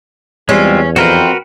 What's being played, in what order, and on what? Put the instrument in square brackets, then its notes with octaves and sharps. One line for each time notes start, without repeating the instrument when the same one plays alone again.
[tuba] E2 [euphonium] G3 [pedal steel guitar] G#3 C4 F4 [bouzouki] C#4
[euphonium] F2 [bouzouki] C4 [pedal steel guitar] F#4 A#4 B4